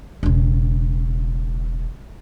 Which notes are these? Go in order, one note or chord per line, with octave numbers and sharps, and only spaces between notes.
E1 C#3